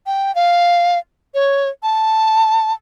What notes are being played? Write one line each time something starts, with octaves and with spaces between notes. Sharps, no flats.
G5
F5
C#5
A5